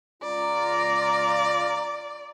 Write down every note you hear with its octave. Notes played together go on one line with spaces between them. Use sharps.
C#2 F4 D5 A#5